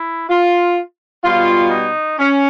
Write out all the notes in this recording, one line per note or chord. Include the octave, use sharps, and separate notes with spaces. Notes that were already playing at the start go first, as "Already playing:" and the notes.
Already playing: E4
F4
B2 G3 F4
D#4
C#4